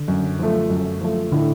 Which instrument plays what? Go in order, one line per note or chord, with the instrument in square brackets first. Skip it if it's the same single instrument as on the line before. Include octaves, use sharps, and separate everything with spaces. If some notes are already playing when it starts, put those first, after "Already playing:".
Already playing: [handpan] D3
[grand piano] F#2
F3 A3
F#2
F3 A3
[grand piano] A2 [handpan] D3